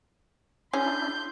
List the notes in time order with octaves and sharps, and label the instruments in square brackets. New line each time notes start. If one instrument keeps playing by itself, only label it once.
[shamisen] C#4 G#4 [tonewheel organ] D4 E4 [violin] C6 G6